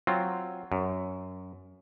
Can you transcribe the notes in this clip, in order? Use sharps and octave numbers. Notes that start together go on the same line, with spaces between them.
F#3 C4 F4
F#2